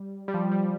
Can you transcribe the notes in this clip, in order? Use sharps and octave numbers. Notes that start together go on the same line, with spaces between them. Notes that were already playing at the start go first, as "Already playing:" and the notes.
Already playing: G3
G3
F3
G3